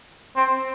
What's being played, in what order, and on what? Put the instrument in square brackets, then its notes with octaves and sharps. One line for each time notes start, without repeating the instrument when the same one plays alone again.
[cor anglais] C4